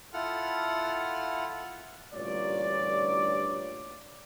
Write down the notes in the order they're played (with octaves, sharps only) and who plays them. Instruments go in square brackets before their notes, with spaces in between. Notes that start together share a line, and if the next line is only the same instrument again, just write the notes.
[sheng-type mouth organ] E4 F4 A4 F#5 F6
[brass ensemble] A1 D2 G2 A#2 C#5 D5